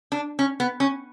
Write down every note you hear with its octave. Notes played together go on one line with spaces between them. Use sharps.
D4
C#4
B3
C#4